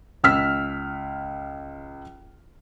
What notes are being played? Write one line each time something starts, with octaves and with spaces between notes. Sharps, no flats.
C#2 E6 F6 B6